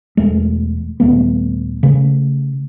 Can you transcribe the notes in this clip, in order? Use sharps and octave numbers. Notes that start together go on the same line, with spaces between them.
E1 G#3 A3
D#1 D#2 A3 B3
C#3 A3